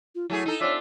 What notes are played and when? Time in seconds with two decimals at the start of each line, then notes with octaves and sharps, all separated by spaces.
0.15 F4
0.30 F#3 A3 E4 G#4
0.46 D#4 A4
0.61 C4 D4 F4 C#5 E5